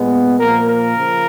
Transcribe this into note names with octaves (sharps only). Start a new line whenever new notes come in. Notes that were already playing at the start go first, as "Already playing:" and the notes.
Already playing: A#2 G#3 B3
A#2 F3 A#3 A#4
A#4
C#3 F3